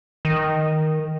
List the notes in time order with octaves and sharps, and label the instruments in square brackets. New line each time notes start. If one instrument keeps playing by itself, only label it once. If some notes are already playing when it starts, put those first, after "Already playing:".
[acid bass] D#3